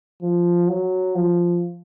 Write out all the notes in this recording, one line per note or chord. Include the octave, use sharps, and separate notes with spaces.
F3
F#3
F3